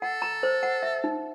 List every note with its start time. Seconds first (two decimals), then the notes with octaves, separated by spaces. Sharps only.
0.02 A4 F#5
0.22 A#5
0.43 C5
0.63 F#5
0.83 E5
1.04 D#4